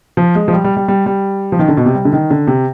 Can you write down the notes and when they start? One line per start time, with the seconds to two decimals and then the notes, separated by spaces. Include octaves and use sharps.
0.17 F3
0.35 G#3
0.48 F3
0.53 G3
0.64 G3
0.77 G3
0.88 G3
1.06 G3
1.52 F3
1.59 D#3
1.68 D3
1.77 B2
1.86 C3
1.95 G3
2.05 D3
2.13 D#3
2.31 D3
2.47 C3